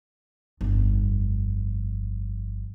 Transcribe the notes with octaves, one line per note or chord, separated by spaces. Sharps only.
G1 F2